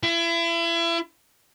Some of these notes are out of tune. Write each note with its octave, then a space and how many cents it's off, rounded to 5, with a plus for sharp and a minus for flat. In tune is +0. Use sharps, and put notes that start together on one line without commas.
E4 +35